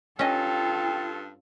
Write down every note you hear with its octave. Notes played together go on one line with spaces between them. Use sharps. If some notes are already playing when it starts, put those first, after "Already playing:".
G2 C#4 F4 A4 D#5 G5